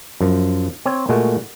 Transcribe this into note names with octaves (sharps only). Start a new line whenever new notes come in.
F#2 F3
C4 C#5
A#2 G#3 A3 F#4